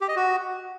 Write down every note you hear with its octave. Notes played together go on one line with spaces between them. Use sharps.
G4
D#5
F#4